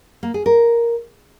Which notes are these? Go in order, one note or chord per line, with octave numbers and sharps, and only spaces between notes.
A#3
G#4
A#4